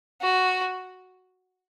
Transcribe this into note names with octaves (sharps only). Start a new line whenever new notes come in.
F#4